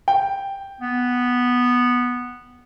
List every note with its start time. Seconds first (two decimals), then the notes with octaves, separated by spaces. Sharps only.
0.08 G5
0.81 B3